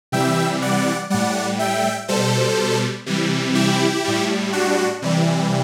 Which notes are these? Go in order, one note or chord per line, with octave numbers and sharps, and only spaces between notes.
C3 E3 G3 E5 G5
D5 F#5
A2 G3 D5 F#5
E5 G5
B2 G3 A4 C5
C3 E3 G3
E4 G4
A2 G3
D4 F#4
C3 E3 G3